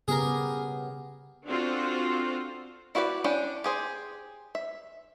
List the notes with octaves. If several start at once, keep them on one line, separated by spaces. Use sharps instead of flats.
C#3 B3 G4 G#4 A#4
C4 D4 F4 F#4 A4 C5
E4 F#4 G4 B4 D5
C#4 D4 E4 G5
G4 G#4 C5
E5